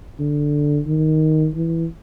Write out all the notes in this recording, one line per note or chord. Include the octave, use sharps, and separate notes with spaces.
D3
D#3
E3